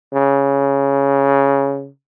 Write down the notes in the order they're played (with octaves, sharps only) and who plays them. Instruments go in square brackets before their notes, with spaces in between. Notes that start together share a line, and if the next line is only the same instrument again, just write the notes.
[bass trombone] C#3